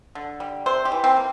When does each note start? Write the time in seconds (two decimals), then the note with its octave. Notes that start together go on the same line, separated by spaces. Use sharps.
0.15 D3
0.40 G3
0.66 C3 C5
0.85 G4
0.92 E3
1.04 C4
1.17 A#3